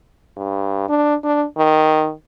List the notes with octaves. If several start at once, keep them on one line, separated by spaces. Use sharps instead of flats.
G2
D4
D4
D#3